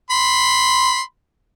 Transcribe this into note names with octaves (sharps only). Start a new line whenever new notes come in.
B5 C6